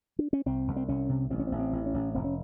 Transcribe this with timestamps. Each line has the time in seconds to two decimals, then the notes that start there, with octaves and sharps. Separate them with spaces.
0.19 D4
0.33 C#4
0.46 C2 C4
0.68 C2
0.76 C4
0.89 C2 C#4
1.09 C3
1.30 A1 C4
1.39 C#4
1.47 C4
1.51 A1
1.59 C4
1.73 A1
1.86 C#4
1.94 A1
2.15 F1 C4
2.24 C#4